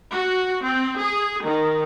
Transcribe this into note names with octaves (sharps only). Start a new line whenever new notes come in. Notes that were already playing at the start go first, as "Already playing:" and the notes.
F#4
C4
G#4
D#3